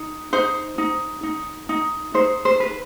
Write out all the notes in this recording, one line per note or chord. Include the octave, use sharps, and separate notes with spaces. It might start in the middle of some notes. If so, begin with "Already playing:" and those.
Already playing: D#4
D#4 C5
D#4
D#4
D#4
D#4 C5
C5
B4